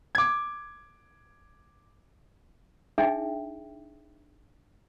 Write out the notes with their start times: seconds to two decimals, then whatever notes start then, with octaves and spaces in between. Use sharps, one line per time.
0.15 D6 G#6
2.98 D4 D#4 G#4 E5 G5